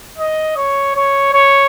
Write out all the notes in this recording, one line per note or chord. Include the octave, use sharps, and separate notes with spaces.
D#5
C#5
C#5
C#5